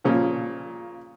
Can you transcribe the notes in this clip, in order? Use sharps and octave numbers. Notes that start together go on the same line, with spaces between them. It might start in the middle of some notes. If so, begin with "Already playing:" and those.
A#2 C#3 F3